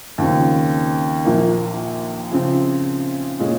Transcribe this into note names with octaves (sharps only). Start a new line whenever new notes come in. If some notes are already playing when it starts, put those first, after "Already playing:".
D#2 C#3 F3 C4
A#1 A#2 F3 A#3
C#3 F3 C4
A#2 G#3 C#4